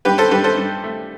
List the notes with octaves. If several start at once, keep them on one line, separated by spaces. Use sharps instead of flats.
G2 G4 B4
A4 C5
G2 G4 B4
A4 C5
G2
A3